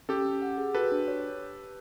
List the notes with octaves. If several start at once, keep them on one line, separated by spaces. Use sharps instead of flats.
C#4 G4 A4
C#4
F#5
G#4
F#4 A4 B4
D4
C#5